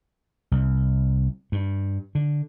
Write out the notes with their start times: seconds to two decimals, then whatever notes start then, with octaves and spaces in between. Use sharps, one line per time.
0.51 C2
1.52 G2
2.15 D3